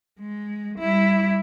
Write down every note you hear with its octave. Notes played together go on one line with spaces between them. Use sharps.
G#3
G3 E4